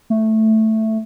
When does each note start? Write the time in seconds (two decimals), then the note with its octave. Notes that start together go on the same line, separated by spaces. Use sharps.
0.10 A3